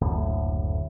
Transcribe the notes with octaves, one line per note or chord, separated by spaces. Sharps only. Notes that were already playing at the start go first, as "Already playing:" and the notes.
F#1 D2 A2